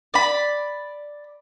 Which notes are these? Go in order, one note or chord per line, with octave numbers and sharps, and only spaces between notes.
D5 B5